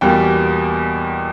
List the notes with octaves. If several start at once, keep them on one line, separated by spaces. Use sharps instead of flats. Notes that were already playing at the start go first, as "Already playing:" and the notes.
E2 B2 G3 A#3 G5